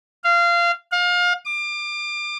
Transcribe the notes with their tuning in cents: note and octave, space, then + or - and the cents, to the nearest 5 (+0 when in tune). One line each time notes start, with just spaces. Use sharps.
F5 -20
F5 +30
D6 +30